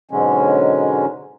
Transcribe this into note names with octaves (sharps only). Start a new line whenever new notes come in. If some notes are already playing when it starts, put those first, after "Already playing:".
G#2 B2 D3 F#3 G#3 C#4